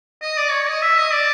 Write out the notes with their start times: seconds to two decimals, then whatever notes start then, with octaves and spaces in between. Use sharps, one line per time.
0.21 D#5
0.38 D5
0.51 C#5
0.67 D#5
0.81 E5
0.97 D#5
1.12 D5